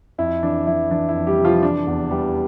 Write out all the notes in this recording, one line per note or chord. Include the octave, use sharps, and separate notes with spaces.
F2 E4
E3 D4
E3 E4
E3 D4
E4
F2
G3 G4
C3
F3 F4
E3 D4
E2
E3 G3 G4